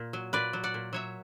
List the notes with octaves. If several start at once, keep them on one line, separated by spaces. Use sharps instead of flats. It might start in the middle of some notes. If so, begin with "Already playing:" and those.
Already playing: A#2
F#3
A#2 B4 D5
F#3
D5 F#5
A#2
F#3 C#5 E5